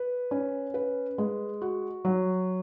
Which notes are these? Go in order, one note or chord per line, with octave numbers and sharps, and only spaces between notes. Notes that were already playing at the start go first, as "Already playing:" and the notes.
Already playing: B4
C#4
B4
G#3
F#4
F#3